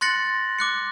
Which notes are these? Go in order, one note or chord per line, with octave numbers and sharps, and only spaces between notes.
C6 F#6 A6 A#6 C#7 F#7
D6 F#6 C#7